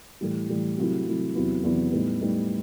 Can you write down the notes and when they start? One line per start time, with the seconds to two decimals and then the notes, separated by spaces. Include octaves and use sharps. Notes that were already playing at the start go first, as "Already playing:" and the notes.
0.21 A2 E3 G3
0.50 A2 E3 G3
0.77 C3 F#3 A3 E4
1.06 C3 F#3 A3 E4
1.35 E2 C3 F#3 B3 E4
1.63 E2 C3 F#3 B3 E4
1.92 A2 G3 B3 D#4
2.21 A2 G3 B3 D#4